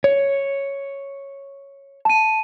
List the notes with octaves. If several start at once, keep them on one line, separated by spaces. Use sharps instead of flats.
C#5
A5 D#7